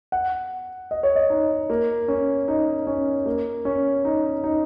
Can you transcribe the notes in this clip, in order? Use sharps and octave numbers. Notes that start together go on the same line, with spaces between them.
F#5
D#5
C#5
D#5
D#4
A#3
C#4
D#4
C#4
A#3
C#4
D#4
D#4